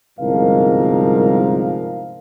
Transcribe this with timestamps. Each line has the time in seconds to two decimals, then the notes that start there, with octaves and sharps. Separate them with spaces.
0.18 G1 C2 G#2 F3 A#4 F5